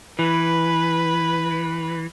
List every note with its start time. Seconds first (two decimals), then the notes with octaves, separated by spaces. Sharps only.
0.19 E3 B4